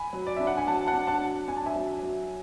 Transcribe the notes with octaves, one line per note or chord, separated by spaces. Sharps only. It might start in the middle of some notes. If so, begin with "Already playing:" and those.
Already playing: G#5 B5
F#3
D5
D4 E5
F#5
G#5
F#3 F#5 A5
F#5 A5
D4
F#5 A5
F#3
D4 G#5
A5
E5 G#5
F#3
F#3